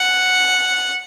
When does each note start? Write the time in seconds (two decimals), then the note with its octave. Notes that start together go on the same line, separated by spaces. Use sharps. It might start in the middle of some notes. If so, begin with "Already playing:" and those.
Already playing: F#5